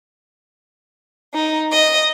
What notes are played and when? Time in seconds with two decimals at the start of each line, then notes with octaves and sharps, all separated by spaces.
1.33 D#4
1.72 D#5